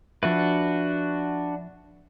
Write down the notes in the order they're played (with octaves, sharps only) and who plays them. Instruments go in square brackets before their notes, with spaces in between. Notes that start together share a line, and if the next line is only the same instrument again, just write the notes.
[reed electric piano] F3 E5 [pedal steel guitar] D4 F#4 B4